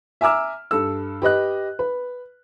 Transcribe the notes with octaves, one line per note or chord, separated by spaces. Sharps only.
E5 G#5 A#5 D6 E6 F6
G2 A4 E6
G4 B4 D#5 F#6
B4